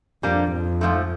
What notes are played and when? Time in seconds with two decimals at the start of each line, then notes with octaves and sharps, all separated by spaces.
0.23 F2 G3 A#3 D4
0.52 F2
0.81 G#2 F3 A3